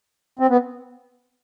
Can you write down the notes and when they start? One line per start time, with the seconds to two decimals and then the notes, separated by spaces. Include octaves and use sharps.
0.39 C4
0.50 B3